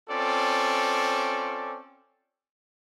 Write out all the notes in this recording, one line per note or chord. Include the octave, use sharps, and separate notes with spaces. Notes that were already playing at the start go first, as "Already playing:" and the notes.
C4 C#4 F4 A4 D5